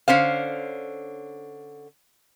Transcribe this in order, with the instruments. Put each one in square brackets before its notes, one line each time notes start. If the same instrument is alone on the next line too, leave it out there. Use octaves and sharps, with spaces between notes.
[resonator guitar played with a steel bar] D3 C#4 C5 F5